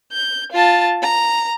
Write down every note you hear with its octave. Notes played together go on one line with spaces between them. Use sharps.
G6
F4 A5
A#5